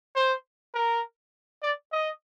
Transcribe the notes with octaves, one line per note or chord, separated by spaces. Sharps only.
C5
A#4
D5
D#5